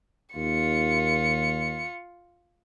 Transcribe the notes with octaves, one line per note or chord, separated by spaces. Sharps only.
D#2 F4 C#7